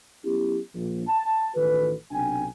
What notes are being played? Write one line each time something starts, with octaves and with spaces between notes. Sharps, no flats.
F#3 B3 C#4 E4 G4
A#1
A5
A1 D#3 F#4 A4 B4
B1 C3 D4 G5 G#5